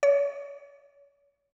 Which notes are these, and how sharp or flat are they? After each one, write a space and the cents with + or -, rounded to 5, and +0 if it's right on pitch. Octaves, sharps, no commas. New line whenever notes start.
C#5 +30